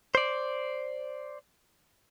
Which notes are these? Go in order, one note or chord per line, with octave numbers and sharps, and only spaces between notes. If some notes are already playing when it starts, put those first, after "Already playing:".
C5 D5